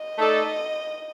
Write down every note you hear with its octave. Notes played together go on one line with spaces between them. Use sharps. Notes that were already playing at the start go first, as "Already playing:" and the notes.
Already playing: D#5
A3 D#4 A4 D5